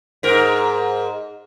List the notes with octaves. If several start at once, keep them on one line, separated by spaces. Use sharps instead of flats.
G#2 A#4